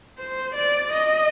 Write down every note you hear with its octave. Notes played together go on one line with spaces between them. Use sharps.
C5
D5
D#5